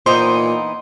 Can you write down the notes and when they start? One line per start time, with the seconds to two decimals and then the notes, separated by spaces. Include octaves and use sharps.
0.06 A#2 E3 B3 D#4 C5 C6